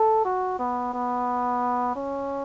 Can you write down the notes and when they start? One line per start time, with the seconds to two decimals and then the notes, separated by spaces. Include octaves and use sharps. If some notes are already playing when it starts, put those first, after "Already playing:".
Already playing: A4
0.25 F#4
0.59 B3
0.94 B3
1.96 C#4